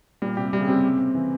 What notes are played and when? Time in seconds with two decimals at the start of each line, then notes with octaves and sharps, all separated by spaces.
0.22 A#2 G3
0.37 C3 G4
0.53 C3 G3
0.60 C#3
0.67 C3 C4
0.83 G4
0.99 C4
1.15 E3